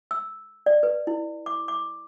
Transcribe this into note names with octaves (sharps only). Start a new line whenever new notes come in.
E6
D5
B4
E4
D6
D6